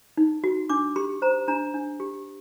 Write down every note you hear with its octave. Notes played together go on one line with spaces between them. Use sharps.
D#4
F#4
D4 D6
G4 C6
C5 A#5
D4 A#5
D4
G4